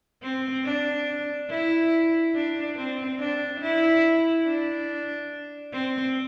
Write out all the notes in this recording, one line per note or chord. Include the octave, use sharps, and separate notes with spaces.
C4
D4
E4
D4
C4
D4
E4
D4
C4